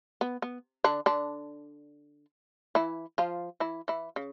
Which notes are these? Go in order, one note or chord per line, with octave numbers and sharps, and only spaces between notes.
B3
B3
D3 D4
D3 D4
E3 E4
F3 F4
E3 E4
E3 E4
C#3